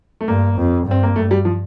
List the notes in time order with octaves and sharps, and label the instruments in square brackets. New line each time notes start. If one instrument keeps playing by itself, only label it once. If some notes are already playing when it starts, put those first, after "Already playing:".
[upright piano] A3
[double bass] G2 [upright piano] A#3
[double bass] F2
[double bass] G2 [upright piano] C4
[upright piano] A#3
[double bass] G2 [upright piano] A3
[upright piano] G3
F3